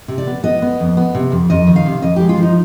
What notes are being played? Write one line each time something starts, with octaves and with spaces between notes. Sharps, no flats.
C3
D5
B3
B3 D#5
B3
F2
B3
C3
F2
F2 D#5
D#3
F5
C3
F2 D#5
G#3 G4
F4
F3
D#4